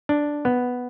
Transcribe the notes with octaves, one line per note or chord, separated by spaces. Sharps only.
D4
B3